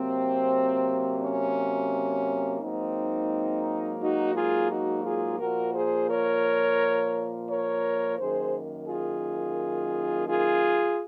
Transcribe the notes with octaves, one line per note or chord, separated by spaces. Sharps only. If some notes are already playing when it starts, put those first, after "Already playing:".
Already playing: C3 F#3 A#3 C4
C#4
G#2 F#3 A#3 C4 D#4
D#4 F#4
F4 G#4
D#4 F#4
F4 G#4
A#2 F3 A#3 F#4 A#4
G#4 C5
A#4 C#5
A#4 C#5
F#2 D#3 A#3 G#4 C5
F4 G#4
F4 G#4